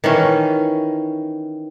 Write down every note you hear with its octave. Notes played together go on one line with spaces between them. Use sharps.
D#3 E3 C#4